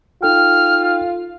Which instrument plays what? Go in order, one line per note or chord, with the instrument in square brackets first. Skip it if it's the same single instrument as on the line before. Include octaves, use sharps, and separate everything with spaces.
[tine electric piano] D#4 A4 G5 [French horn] F4 [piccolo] F6